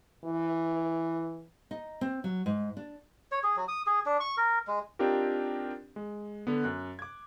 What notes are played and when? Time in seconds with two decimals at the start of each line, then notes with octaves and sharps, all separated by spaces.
0.25 E3
1.71 D#4
2.01 C4
2.24 F#3
2.46 G#2
2.77 D4
3.32 C#5
3.43 G#4
3.56 F#3
3.68 D#6
3.87 G#4
4.06 D4
4.20 C#6
4.37 A#4
4.67 G#3
4.99 C4 D4 D#4 F4 G4 A#4
5.96 G#3
6.47 D3 B3
6.64 F#2 F#6
6.99 D6 G#6